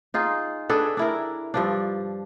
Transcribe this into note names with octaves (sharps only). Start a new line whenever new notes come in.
D#4 F4 G#4
D4 G#4 A4 B4
D4 E4 A#4
G2 F3 D4